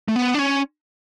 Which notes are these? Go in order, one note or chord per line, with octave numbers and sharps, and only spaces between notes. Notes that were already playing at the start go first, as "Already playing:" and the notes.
A3
B3
D4
C#4